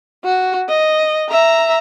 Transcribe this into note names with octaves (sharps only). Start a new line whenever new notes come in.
F#4
D#5
E5 A#5